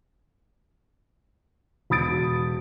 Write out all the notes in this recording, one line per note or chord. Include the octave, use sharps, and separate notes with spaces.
E1 B5 D#6 A6 D7